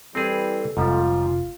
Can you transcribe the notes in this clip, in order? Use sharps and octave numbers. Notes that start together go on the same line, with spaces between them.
E3 G3 C4 G#4 A4
F1 G#2 F3 G3 F4